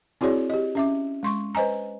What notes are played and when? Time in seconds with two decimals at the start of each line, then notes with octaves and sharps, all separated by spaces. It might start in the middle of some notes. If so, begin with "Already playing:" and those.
0.21 C4 E4 F#4 G#4 C#5 D5
0.50 G4 D#5
0.75 C#4 E5 D6
1.23 G#3 C6 C#6
1.55 B4 C5 D#5 G#5 A#5